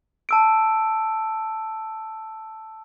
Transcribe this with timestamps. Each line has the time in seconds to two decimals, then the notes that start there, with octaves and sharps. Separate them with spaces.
0.29 A5 E6 D7